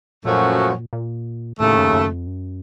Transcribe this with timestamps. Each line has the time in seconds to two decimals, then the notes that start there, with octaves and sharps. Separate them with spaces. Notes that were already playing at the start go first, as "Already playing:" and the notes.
0.25 F#2 A#2 F3 A3 C#4 F#4
0.93 A#2
1.59 D#2 A2 C#3 A3
1.77 F#2
1.93 F#2
2.10 F2
2.27 F#2